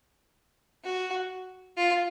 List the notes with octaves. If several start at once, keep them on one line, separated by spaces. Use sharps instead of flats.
F#4
F4